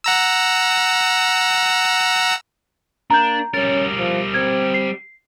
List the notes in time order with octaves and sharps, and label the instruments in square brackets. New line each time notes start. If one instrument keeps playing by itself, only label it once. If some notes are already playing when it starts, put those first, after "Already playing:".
[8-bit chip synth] F#5 A#5 E6
[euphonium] A#3 [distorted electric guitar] D4 [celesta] A#5 G6
[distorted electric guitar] G3 A#4 [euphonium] C#4 [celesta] A6
[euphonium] F3
[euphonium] C4 [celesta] G#6
[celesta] C7